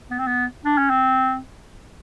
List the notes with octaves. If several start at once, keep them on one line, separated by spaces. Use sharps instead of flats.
B3
C4
B3
D4
C#4
C4